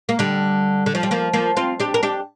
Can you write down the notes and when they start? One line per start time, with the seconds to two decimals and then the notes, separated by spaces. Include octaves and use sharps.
0.09 A#3
0.19 D3 G3
0.86 D3
0.95 F3
1.03 G3
1.11 F3 A#3
1.33 F3 A#3
1.57 C4 F4
1.80 D4 G4
1.94 A#4
2.03 D4 G4